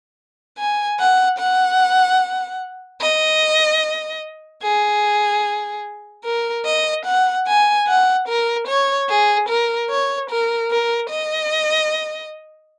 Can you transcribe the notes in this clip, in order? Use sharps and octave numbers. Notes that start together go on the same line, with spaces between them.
G#5
F#5
F#5
D#5
G#4
A#4
D#5
F#5
G#5
F#5
A#4
C#5
G#4
A#4
C#5
A#4
A#4
D#5